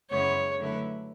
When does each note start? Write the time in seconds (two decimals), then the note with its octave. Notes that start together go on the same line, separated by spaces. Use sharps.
0.10 F#2 C#3 G#3 B3 E4 C#5
0.58 D3 F#3 A3 E4 B4